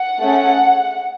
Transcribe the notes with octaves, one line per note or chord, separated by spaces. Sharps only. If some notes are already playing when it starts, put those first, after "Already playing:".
Already playing: F#5
A3 C#4 G#4